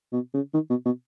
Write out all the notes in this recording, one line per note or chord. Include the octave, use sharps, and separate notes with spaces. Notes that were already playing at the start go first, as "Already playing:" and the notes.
B2
C#3
D#3
B2
B2